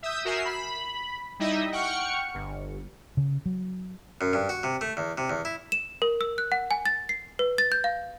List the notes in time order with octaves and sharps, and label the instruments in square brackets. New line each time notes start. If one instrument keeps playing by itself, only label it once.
[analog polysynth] E5 D#6 E6 G6
F#4 A#4 E5 G#5 C7 E7
B5
G3 D#4 E4 D#5 E5
F#5 G5 C#6 F6 C#7
G1
[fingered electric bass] C#3
F#3
[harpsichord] F#2
G2
F#4
C3
A3
E2
C3
E2
E4
[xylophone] E7
A#4
E6
F#6
F#5
G#5
A6
C7
B4
A6
G6
F5